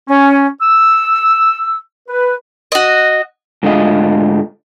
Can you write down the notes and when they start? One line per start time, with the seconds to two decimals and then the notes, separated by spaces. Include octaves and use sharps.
0.08 C#4
0.61 E6
2.08 B4
2.72 F#4 D#5
3.63 G#2 D3 A3 F4 D#5